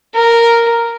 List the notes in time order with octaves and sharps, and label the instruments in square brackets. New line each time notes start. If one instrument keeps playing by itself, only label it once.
[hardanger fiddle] A#4